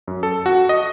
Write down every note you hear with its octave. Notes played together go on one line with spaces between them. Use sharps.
F#2
A4
F#4
D#5